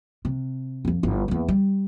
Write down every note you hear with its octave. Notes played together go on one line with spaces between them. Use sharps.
C3
F2 F3
G1 E4
E2 A#3
G3